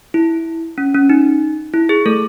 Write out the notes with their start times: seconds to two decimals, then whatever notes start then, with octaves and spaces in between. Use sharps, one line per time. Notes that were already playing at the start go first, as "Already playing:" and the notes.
0.14 E4
0.78 C#4
0.94 C#4
1.09 D#4
1.73 E4
1.89 G#4
2.06 A3 A4